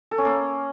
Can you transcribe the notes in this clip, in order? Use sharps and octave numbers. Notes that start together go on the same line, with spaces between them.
A4
C#4
A#3